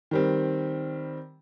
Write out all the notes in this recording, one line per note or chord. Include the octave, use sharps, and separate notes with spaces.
D#3 G3 C4